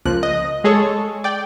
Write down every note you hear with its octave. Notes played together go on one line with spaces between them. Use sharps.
C#2 F3 A#3 F#6
D#5
G#3 G#4 A4 C#5
D5 G5